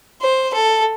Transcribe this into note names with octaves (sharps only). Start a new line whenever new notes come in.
C5
A4